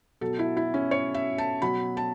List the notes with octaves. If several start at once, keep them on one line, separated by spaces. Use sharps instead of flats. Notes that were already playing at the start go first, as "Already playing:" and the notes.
B2 F#3 A4
E4
E4
C#4
C#5
E5
A5
B2 F#3 B5
A5